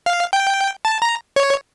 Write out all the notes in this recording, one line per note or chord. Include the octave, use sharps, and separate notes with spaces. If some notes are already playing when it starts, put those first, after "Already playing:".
F5
G5
A5
A#5
C#5